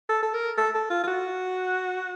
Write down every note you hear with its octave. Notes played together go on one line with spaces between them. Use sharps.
A4
A4
A#4
A4
A4
F4
F4
F#4